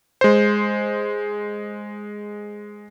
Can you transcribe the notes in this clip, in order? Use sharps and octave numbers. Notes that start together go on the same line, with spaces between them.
G#3 C5